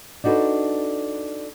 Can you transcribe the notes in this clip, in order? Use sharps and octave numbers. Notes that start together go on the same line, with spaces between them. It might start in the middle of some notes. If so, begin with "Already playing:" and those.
D4 D#4 F#4 A4 B4